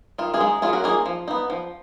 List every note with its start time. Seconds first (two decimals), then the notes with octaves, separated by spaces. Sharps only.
0.18 D#3 F4
0.34 F4 G#4
0.41 G#3 D#4
0.62 F#3 F4 G#4
0.73 F#4 A#4
0.84 A#3 D#4 F4 G#4
1.06 F3
1.28 B3 D#4
1.50 F3